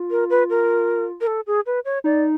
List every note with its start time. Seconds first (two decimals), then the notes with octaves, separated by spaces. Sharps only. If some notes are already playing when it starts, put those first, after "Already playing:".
Already playing: F4
0.11 A#4
0.30 B4
0.50 A#4
1.21 A#4
1.27 A4
1.47 G#4
1.66 B4
1.85 C#5
2.04 D#4 D5